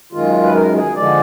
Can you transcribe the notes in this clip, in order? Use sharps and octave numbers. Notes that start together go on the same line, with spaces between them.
F#2 D#3 G#3 F4
B4
A#4
G#4
D3 F3 G#3 D5